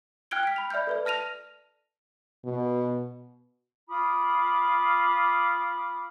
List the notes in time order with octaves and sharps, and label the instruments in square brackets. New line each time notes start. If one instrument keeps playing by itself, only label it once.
[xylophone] G5 F6 F#6 G#6 D7 G7
F6 B6
B5 F7
D5 E5 B5 F6 G6
A4 B4 D5
A5 F6 A#6 D#7 F7
[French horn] B2
[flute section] F4 B5 D6 D#6